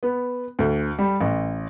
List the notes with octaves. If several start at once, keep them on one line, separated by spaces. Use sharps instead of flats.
B3
D2
G3
A1